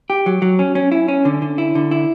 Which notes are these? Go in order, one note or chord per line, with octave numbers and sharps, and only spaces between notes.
G4
F#3
F#3
C#4
C#4
E4
C#4
D3
D3
E4
D3
E4